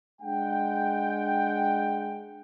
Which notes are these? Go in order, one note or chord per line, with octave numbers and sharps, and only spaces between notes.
G#3 D4 F#5 G5